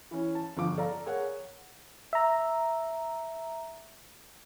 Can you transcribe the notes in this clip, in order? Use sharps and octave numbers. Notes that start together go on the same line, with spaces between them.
E3 C#4
A5
G1 F3 F5 D6
A4 D5 F5 A#5
G#4 A#4 C#5 F#5
E5 A#5